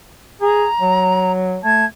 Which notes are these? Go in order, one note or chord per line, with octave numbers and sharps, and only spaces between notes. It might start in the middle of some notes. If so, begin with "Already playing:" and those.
G#4 A#5
F#3
A3 A5 G#6